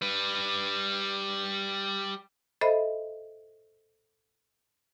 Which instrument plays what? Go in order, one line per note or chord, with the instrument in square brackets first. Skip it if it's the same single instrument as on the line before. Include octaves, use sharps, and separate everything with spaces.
[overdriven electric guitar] G3 B4
[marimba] A4 C5 D#5 E5 B5